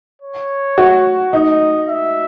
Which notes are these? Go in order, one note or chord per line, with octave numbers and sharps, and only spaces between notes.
C#5
F#4
D#4 D#5
E5